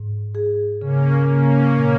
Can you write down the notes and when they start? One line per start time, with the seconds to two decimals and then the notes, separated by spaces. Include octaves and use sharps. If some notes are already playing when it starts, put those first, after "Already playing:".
Already playing: G#2
0.35 G#4
0.81 C#3 A#3 C#4
1.28 C#3 A#3 C#4
1.75 A#2